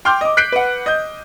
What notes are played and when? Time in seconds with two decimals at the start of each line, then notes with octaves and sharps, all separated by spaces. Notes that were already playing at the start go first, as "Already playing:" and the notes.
0.05 G5 C6 D6 F6 G6
0.21 D#5 D6
0.37 F#6 G6 B6 C7 D7
0.52 B4 F#5
0.86 D#5 G6